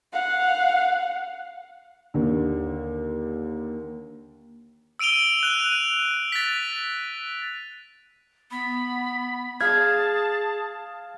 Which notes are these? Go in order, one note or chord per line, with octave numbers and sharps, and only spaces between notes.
F5 F#5
D#2 D3
E6 D7 D#7 F7 G7
F#6 F7
D#7
A6 B6
B3 B5
G#4 F5 A5 G#6